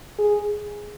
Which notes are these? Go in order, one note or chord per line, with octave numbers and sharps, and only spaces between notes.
G#4